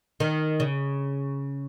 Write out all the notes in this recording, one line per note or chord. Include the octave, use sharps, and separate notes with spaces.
D#3
C#3